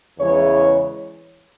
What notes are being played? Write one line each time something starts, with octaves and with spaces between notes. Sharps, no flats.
E2 C#3 E3 G#3 C#5